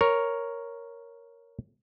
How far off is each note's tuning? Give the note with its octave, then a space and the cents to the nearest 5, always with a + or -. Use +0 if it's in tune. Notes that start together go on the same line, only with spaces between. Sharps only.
A#4 +0 C#5 +0